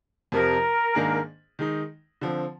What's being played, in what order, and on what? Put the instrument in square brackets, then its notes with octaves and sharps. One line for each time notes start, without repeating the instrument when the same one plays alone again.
[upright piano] F2 C3 F3 [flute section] A#4
[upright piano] G#2 D#3 A#3 D4 G#4
D#3 G#3 D#4
D3 F3 C4